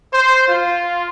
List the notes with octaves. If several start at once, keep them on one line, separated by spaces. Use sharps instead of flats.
C5
F4